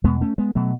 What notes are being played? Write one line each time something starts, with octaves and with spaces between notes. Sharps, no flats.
E2 B2 G#3 B3
A3 C#4
G#3 B3
B2 F#3 A3